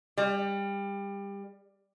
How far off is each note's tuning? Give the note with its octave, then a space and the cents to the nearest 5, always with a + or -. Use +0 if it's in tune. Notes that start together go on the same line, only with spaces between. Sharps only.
G3 +25